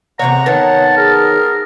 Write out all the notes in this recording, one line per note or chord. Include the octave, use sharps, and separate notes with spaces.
E2 C3 C#5 F#5 A#5
D#3 B3 C#5 A5
G#4 A#4